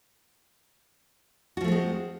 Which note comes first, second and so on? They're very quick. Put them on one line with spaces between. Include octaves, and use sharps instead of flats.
F#4 F3 A3 C4 G#3